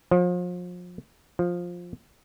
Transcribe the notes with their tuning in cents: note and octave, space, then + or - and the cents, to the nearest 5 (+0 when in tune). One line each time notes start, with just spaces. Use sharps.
F3 +35
F3 +10